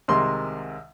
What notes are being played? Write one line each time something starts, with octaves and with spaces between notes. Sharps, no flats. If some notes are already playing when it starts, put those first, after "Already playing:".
C2 C3 D#3 G#3 C6